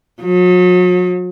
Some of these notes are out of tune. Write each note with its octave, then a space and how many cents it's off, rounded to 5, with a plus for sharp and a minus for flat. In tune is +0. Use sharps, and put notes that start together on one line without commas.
F#3 -40